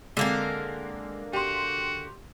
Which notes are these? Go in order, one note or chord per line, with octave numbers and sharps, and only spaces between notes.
D3 G#3 A#3 C4 A#4
F#4 G4 C6